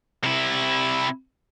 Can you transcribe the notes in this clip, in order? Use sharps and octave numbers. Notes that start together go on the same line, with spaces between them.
C3 E4